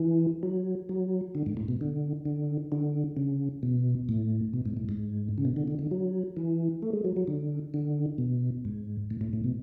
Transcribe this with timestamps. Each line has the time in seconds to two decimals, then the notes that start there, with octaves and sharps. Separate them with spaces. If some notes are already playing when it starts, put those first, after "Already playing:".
Already playing: E3
0.43 F#3
0.89 F#3
1.35 D3
1.46 G#2
1.57 A2
1.68 B2
1.81 D3
2.25 D3
2.72 D3
3.17 C#3
3.63 B2
4.09 A2
4.53 B2
4.65 G#2
4.77 A2
4.89 G#2
5.38 C#3
5.45 B2
5.56 D3
5.67 D3
5.79 D3
5.91 F#3
6.37 E3
6.82 A3
6.93 G#3
7.05 F#3
7.16 F#3
7.27 D3
7.74 D3
8.18 B2
8.65 G#2
9.11 A2
9.21 A2
9.33 A2
9.44 B2